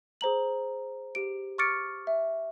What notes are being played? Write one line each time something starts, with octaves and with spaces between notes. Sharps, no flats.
G#4 C5 A#5 F#7
G4 D7
C#6 D6 F6 A6 C#7 D7
E5